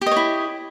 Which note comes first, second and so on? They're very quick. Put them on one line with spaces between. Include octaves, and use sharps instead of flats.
G4 D#5 C#5 E4